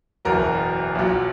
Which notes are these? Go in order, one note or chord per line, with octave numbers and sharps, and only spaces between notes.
F#1 E2 B2 F#3 A#4
B1 A#2 F#3